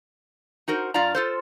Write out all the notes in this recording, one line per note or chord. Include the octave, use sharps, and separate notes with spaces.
D#4 F#4 A#4 C5
G2 D4 F4 D5 F5 A#5
F4 A4 C5